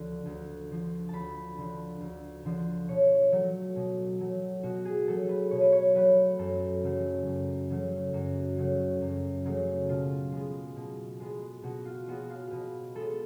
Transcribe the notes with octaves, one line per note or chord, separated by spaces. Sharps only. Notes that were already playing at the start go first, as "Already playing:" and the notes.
Already playing: D2 D3 F3
D2
D3 F3
D2 A5 B5
D3 F3
D2
D3 F3
B2 C#5
F#3 A3
B2
F#3 A3
B2 F#4
G#4
F#3 A3 A4
B4
B2 C#5
B4
C#5
F#3 A3 B4
F#2 A4
C#3 F#3 A3
F#2
C#3 F#3 A3
F#2 F#4
C#3 F#3 A3
F#2
C#3 F#3 A3
B2 F4
G#3 B3
B2
G#3 B3
B2 F#4
F4
G#3 B3 F#4
F5
B2 B4
G#3 B3 A4